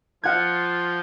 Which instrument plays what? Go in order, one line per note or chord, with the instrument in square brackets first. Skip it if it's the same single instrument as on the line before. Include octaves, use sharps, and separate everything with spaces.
[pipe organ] F3 [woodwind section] F4 [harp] F#5 F6 G#6